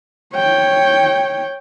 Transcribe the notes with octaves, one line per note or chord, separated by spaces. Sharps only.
C#5 G5